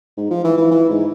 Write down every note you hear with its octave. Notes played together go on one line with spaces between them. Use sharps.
G#2
F3
E3
E3
E3
G#2